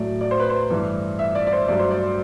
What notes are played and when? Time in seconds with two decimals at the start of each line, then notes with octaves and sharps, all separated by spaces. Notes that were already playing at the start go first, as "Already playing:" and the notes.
Already playing: A2 F#3 A3 D5
0.21 D5
0.31 C5
0.40 B4
0.50 C5
0.70 G2 E3 A3
1.19 E5
1.35 D5
1.47 D5
1.52 C5
1.68 G2 F#3 A3 D5
1.79 C5
1.91 D5